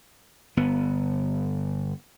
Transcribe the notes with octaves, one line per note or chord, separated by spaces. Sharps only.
G1 B3